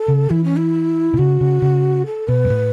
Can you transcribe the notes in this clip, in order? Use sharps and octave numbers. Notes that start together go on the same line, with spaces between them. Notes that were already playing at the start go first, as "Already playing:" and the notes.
Already playing: A4
C#3
E3 E4
C#4
E4
B2
C#3 F#4
C#3
C#3
A4
B2 B4
F#2
A2